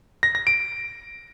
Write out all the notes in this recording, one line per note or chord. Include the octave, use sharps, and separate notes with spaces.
A#6
A#6
D7